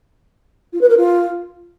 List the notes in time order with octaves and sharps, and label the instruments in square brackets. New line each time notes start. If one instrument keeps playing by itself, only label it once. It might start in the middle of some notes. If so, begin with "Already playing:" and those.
[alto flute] F4
B4
A#4
F4